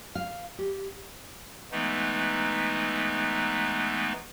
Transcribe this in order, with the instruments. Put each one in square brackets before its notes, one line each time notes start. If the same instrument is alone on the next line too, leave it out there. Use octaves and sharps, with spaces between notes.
[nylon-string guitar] F5
G4
[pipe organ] E3 G#3 A3 B3 D#4